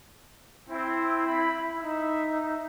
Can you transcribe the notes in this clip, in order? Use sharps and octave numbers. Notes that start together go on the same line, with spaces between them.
C4 E4
B5
D#4 E5